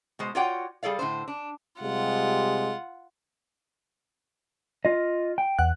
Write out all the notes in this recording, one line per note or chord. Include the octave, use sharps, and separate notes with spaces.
B2 G#3 C5
F4 F#4 C#5 D5 F#5 G5
G3 G#4 A4 D5 F5
A2 D3 F3 C5
D4
C3 G3 G#3 F4 F#5
F4 D#5
G5
E2 F#5 F#6